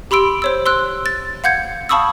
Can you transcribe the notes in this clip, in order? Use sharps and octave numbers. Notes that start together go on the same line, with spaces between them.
G4 B5 C6 E6 D7
C5 C#5 E6
C6 E6 F#6
A6
F5 F#5 G6 G#6 C#7
F5 A5 B5 C#6 D#6 E6